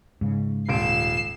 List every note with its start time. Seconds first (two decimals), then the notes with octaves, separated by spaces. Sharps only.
0.21 G#2 C#3
0.69 D#1 F4 C7 D7 E7